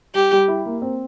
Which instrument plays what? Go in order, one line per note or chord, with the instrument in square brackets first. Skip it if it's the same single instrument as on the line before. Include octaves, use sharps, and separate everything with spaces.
[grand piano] G3 [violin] G4
[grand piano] G3
E4
A#3
C4